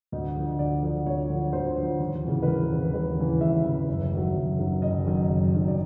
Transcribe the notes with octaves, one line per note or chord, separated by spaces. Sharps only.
D2 D#5
D3 F3
D2 D5
D3 F3
D2 C#5
D3 F3
D2 C5
D3 F3
D#2
C#3 E3
B4
D#2 A#4
C#3 E3
D#2 B4
C#3 E3
D#2 E5
C#3 E3
F#1
F#2 D#3 F#3
F#1
F#2 D#3 F#3
F#1 D#5
F#2 D#3 F#3
F#1
F#2 D#3 F#3
D5